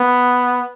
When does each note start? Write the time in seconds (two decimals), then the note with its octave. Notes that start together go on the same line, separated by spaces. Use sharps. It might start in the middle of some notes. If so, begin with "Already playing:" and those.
Already playing: B3